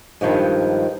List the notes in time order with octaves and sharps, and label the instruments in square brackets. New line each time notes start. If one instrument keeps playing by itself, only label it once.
[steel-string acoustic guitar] G2 D#3 F3 G#3